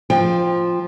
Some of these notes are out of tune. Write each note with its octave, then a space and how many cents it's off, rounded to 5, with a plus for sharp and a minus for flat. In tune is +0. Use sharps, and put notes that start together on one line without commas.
F3 +0 G5 +20